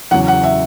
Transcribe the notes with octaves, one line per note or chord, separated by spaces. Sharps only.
E2 C#3 F#3 F#5
F#5
E5